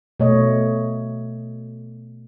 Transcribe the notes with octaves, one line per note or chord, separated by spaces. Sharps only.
B2 A3 C#5 D#5